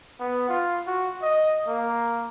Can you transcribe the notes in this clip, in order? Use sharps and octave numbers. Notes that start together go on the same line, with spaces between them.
B3
F4
F#4
D#5
A#3